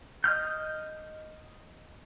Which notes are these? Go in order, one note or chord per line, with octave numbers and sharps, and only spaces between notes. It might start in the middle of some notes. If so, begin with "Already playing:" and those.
D#5 D#6 F6 G6